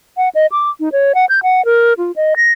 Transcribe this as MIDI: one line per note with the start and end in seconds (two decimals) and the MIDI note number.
0.17 0.29 78
0.35 0.46 75
0.52 0.70 86
0.80 0.89 63
0.92 1.13 73
1.15 1.25 78
1.29 1.40 91
1.43 1.64 78
1.65 1.93 70
1.98 2.12 65
2.16 2.34 75
2.36 2.52 94